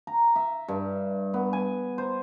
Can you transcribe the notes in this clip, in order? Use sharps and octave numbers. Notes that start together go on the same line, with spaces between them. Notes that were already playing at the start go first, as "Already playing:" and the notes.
A#5
E5
G2
B3
G#5
C5